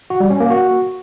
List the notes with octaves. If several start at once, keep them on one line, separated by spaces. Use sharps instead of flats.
F#4
G3
C#4
A#3
F#4